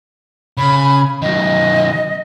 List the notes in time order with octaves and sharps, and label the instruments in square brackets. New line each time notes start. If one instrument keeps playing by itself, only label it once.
[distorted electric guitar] C#3 [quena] B5
[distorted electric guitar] D#3 F#3 [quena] D#5